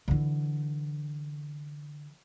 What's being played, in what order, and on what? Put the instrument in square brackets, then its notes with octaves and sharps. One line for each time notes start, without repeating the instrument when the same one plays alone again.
[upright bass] D3 E3